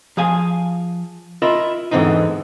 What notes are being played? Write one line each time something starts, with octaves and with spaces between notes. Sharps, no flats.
F3 G#4 F5 G#5
E4 F4 A#4 D#5 E5
E2 G#2 D3 E3 C4 D#4